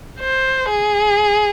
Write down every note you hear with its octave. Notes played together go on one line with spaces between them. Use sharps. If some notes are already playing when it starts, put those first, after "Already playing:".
C5
G#4